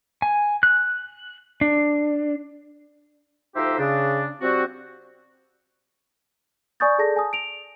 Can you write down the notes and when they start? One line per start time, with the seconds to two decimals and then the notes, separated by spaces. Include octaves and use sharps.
0.22 G#5
0.63 F#6
1.61 D4
3.55 D2 F3 D#4 G4 C5 E5
3.79 C#3 D4
4.41 F3 G3 C4 F#4
6.80 D5 G#5 C#6 D#6 G6 A6
6.98 G#4 A4 D5 A5 A#6
7.16 G#5 A5 D#6
7.33 D7 F7